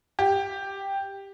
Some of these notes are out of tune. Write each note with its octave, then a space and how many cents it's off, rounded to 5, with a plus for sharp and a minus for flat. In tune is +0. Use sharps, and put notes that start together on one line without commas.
G4 +5